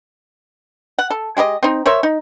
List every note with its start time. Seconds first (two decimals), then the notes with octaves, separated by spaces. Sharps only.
0.99 F#5
1.10 A4
1.37 G#3 G4 A#4 D#5
1.63 C4 D#4
1.86 A#4 C5 C#5 E5
2.03 D#4